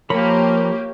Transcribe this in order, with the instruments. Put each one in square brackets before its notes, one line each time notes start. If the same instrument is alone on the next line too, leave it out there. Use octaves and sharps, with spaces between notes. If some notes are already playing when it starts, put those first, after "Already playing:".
[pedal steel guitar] F3 A#4 B5 [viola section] A#3 G4 [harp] C#5